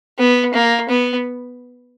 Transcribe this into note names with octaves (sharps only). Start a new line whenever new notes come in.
B3
A#3
B3